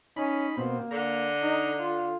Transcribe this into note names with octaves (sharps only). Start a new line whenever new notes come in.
C#4 D#4 B5
B2 A#3 C4
D3 A#5
D#4
F4